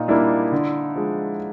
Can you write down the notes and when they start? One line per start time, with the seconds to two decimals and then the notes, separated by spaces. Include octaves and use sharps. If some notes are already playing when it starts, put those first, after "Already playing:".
Already playing: A#2 D#4 F4
0.08 G3 A#3 D4 E4
0.52 D3
0.96 F3 G#3